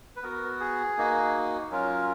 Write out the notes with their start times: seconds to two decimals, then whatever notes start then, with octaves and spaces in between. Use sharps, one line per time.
0.16 B4
0.23 B3 F#4 A#4
0.60 G#4
0.98 A#3 D#4 F#4
1.71 F#3 C#4 F4 A#4